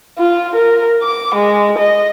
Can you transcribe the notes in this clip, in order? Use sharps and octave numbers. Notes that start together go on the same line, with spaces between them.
F4
A#4
D6
G#3
D#5